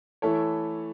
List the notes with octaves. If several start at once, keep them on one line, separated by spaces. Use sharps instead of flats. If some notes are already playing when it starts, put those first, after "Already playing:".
E3 A3 E4 A4 C#5